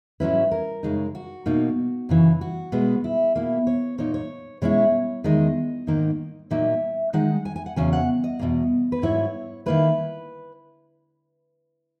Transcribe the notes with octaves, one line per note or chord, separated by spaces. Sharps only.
G#2 F#3 C#4 E4 B4
A#4
F#2 C#3 G#3 D#4
F#4
B2 A#3 D#4
F#2 C#3 E3
F#4
B2 G#3 B3
E4
B2 A#3 E4
C#5
A#2 A#3 D#4 C#5
C#5
B2 G#3 C#4 E4 C#5
E2 D#3 G#3 D#5
G#2 D#3 A#3 D#4
A#2 F#3 A#3 D#4 E5
D#3 G#3 D#4 F#5
G#5
G#5
F#5
E2 C#3 F#3 C#4 G#5
F#5
D#5
E2 B2 F#3 A#3
B4
G#2 F#3 B3 E4 C#5
D#3 A#3 E4 B4